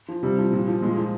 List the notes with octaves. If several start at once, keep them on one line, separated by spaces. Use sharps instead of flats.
F3
C3 G3
F3
A#2
F3
A#2 G#3
F3